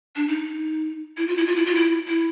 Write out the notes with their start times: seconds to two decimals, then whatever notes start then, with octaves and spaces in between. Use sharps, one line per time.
0.16 D4
0.28 D#4
1.17 E4
1.28 F4
1.37 E4
1.47 F4
1.56 E4
1.66 F4
1.75 E4
2.08 E4